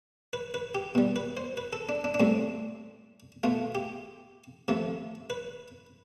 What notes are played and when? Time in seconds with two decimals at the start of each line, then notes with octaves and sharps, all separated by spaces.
0.33 B4
0.54 B4
0.75 G4
0.95 B2 G3
1.16 B4
1.37 C5
1.57 B4
1.73 A4
1.89 D4
2.04 D4
2.14 D4
2.20 A2 G3 C4
3.43 B2 A3 F4
3.75 G4
4.68 C3 F3 A3
5.30 B4